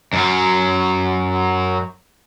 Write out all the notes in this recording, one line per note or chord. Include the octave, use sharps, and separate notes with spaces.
F#2 F#3